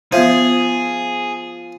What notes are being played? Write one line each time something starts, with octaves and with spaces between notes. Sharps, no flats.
F3 B3 G#4 C5 E5